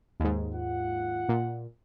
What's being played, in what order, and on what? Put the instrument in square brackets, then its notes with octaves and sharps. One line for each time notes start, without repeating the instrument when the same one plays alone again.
[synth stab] D#2 G#2
[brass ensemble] F4 F#5
[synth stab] A#2